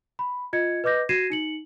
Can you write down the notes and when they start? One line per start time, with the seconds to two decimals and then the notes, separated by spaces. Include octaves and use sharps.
0.19 B5
0.53 F4 D#5 G#6 C#7
0.84 B4 D#5 D6 G6 A#6
1.09 F#4 G#6 A#6 C7 D#7 E7
1.30 D#4 C#7 F#7